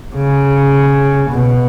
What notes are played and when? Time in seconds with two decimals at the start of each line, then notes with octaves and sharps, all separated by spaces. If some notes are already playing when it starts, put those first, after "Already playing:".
0.15 C#3
1.30 B2